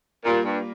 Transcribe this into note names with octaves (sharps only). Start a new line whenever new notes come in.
A#2 G3 A#3 F4 A#4
G2